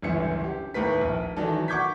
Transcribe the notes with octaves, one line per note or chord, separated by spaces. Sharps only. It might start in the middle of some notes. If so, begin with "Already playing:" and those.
G1 C#2 F#2 D3 E3 C#7
G4
D#2 A2 A#4 B4 B6
A#1
D#3 E3 F#3 D4 A4
F#5 C#6 D6 G6 G#6 B6